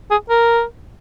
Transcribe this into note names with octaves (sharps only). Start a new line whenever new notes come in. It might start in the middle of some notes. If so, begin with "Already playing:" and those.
G#4
A#4